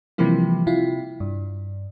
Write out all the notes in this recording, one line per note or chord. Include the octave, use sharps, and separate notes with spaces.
C3 E3 F3 G3 A#3 E4
C3 E4 F4
G2